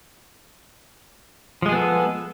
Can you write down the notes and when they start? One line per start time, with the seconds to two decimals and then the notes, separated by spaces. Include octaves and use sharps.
1.62 F3
1.66 G#3
1.69 G#4
1.72 B3
1.76 A4